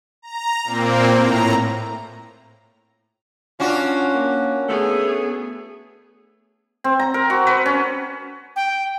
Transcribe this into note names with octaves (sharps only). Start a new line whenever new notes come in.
A#5
A#2 A#3 C4
A2 A#5
C#4 D4 F4 F#4
A#3
A3 B3 G#4
C4
A#5
A#4
F#4
B4
C#4
G5